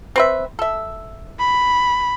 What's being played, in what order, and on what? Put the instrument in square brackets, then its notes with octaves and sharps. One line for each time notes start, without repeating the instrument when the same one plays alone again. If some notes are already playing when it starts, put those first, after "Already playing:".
[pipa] C4 B4 E5
A4 E5
[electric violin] B5